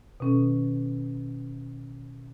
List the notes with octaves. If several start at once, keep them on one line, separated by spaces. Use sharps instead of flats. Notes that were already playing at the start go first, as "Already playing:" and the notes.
B2 D#3 C#4 A4